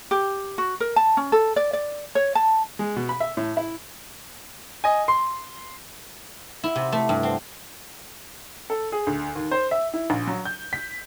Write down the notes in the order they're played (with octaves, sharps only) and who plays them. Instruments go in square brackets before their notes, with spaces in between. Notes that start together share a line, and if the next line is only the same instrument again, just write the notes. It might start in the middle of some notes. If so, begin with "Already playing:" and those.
[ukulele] G4
F#4
A#4
A5
C#4
A4
D5
D5
C#5
A5
[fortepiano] G#3
B2
B5
E5
A2
E4
[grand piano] D#5 G#5
C6
[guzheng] E4
C3
A3
G2
C4
[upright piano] A4
G#4
D2
D#2
C5
E5
E4
A#1
F#3
G6
B6